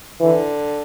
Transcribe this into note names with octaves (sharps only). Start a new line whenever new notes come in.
D3 E3